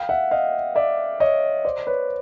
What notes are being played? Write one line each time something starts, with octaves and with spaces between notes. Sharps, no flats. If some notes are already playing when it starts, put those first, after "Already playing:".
Already playing: F5 G5
E5 F#5
D#5 F5
D5 E5
C#5 D#5
C5 D5
B4 C#5